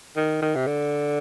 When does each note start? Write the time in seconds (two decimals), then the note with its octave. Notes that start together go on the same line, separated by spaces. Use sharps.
0.17 D#3
0.42 D#3
0.56 C3
0.67 D3